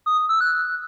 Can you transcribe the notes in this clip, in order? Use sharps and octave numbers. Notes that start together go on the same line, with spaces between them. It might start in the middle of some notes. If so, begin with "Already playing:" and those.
D#6
D#6
E6
F#6